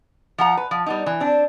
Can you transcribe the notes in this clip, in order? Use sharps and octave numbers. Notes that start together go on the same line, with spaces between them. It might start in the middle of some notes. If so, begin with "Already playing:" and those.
F3 F#5 A#5
B4
F3
G3 B3 D#4
E3
C4 D4